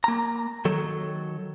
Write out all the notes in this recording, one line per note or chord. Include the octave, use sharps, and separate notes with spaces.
A#3 A#5
D#3 F#3 A4